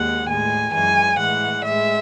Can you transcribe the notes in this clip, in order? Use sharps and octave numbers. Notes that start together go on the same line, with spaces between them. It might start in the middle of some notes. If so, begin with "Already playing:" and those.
Already playing: D#2 D#3 G#3 F#5
A2 G#3 G#5
F#2 E3 G#3 G#5
A2 E3 G#3 F#5
A2 G#3 E5